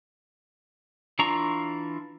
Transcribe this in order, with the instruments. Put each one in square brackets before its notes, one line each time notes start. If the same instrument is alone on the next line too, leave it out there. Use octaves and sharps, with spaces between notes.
[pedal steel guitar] E3 D4 F4 A#5 C#6